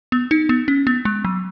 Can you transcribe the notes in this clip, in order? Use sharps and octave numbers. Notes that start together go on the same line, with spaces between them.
B3
D#4
B3
C#4
B3
G#3
F#3